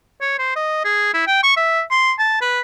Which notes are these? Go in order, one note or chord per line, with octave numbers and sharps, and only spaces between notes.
C#5
C5
D#5
G#4
E4
G5
C#6
E5
C6
A5
B4